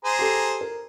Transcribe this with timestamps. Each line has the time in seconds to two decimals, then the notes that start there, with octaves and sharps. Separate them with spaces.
0.05 G#4 C5 A#5
0.19 G4 A4
0.61 A#4